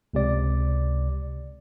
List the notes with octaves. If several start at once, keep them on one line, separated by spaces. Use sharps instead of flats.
C#2 C3 D5